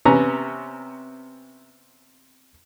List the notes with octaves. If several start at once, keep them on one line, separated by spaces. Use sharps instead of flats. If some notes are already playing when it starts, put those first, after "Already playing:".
C3 B3 C#4 A#5